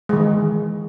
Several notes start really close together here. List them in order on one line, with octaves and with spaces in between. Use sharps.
G#3 D#3 E3